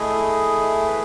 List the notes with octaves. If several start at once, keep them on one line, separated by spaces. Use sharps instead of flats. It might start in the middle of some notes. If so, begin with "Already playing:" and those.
Already playing: A3 E4 G#4 D#5
B4